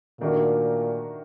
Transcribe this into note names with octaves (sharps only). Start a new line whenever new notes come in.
A#2 D#3 A3 D4 F#4 A#4